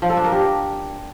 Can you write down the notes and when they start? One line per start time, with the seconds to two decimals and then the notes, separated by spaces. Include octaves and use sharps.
0.02 F3
0.10 A4
0.17 D4
0.24 A#4
0.32 G4